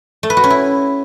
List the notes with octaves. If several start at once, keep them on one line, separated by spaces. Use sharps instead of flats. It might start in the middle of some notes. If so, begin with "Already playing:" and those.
A3
B4
F#4
C#4
E4